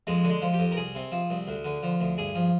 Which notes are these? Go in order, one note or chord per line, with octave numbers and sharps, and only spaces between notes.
F2 G#3
D3
G#3
F3
G4
F2
A#4
C2 G#4
C3
F3
C2
D2
D3
F3
D2
G2 G#4
F3